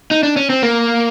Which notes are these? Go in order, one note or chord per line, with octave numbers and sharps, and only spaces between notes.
D#4
D4
C#4
C4
A#3